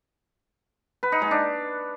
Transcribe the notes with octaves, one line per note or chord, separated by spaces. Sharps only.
B4
D#4
G#3
D4